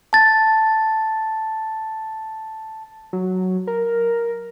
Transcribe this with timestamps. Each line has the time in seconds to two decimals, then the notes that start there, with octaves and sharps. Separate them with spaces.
0.13 A5 A6
3.13 F#3
3.67 A#4